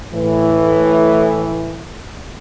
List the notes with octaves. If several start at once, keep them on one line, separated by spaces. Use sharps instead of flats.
A2 E3